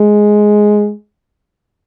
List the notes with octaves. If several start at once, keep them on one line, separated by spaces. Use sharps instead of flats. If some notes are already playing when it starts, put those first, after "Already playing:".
Already playing: G#3